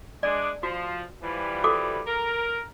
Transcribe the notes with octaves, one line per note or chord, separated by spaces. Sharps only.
G#3 D4 D5
F3 F#4
E3 F3 G3
F#4 A4 D6
A#4